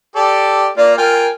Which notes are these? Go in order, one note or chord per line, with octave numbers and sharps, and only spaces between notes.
G4 A4 D5
A#3 F4 D5
F4 A#4 G5 G#5